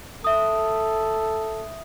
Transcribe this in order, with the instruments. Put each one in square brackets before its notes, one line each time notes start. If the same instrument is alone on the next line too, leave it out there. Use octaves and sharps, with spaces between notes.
[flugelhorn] A4 [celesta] E5 D#6